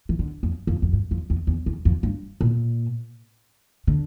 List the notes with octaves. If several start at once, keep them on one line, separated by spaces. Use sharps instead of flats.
E3
D3
F2
F2
F2
G2
F2
E2
E2
E2
F2
G2
A#2
D3